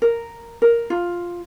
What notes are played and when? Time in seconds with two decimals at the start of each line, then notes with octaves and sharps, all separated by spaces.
0.02 A#4
0.62 A#4
0.90 F4